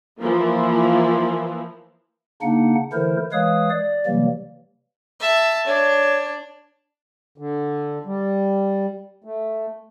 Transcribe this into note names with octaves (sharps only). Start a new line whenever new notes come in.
E3 F3 A#3 E4
C#3 A#3 D4 D#4 F#5
D3 E3 A3 E4 A#4 C5
E3 G#3 B4 C#5 F5 D#6
D5
C3 E3 F#3 G3 A#3
E5 A5
D4 C#5
D3
G3
A3